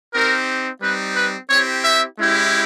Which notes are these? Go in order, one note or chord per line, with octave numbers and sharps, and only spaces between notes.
C4 D#4 G4 A#4
G3 C4 D#4 B4
B4
C4 E4 G4 C#5
E5
G#3 C#4 E4 G4